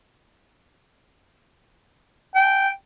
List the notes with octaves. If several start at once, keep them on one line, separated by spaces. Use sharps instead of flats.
G5